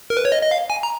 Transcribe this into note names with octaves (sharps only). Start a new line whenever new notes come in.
A#4
B4
C#5
D#5
D#5
F5
G#5
A#5